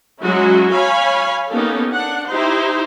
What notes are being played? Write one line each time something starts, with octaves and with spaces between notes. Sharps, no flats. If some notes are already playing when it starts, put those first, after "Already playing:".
F#3 G#3 C#4 E4 F#4
C#5 F5 G#5 B5
A#3 B3 C#4 D#4 G4 A4
D4 F#5
D#4 E4 G4 C5